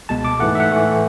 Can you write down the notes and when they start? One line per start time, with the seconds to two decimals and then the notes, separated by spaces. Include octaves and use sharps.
0.09 C#2 B2 G#3 A5
0.25 D6
0.39 G#2 E3 A3 F#5
0.55 E5
0.60 F#5
0.71 A2 E3 A3